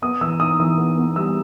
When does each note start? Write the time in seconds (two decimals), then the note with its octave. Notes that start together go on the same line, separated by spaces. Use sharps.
0.02 B3 D#6
0.21 E3 E6
0.40 D#4 D#6
0.59 E3 D#6
0.78 B3
0.98 B3
1.16 G3 E6